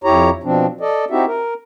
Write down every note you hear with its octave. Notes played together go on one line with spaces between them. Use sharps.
F2 E4 G4 C#5 A#5
B2 F3 C4 D4
A4 D5 D#5
C4 D#4 E4 F#4 G4 E5
A#4